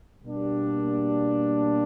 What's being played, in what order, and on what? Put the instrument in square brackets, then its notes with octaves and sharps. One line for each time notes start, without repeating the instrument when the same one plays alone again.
[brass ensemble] B2 G3 A#3 D4